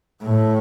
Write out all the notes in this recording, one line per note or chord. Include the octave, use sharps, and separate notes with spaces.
A2